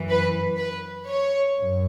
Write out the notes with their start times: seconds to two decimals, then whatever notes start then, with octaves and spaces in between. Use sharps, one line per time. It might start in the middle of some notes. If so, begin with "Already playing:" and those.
Already playing: F#2 E3
0.09 B4
0.59 B4
1.08 C#5
1.57 F#2